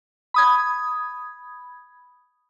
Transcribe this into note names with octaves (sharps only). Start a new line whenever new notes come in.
B5 D#6 G#6